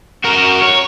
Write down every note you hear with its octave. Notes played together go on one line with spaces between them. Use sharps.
F#4 A#4
C#5